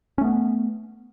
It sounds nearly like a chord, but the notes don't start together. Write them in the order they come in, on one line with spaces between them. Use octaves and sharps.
C#4 A3 B3